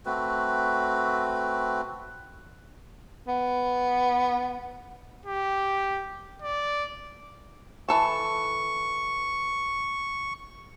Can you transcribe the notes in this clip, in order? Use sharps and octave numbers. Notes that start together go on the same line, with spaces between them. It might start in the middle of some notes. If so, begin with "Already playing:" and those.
A3 C4 F#4 B4
B3
G4
D5
E3 A4 A5 C#6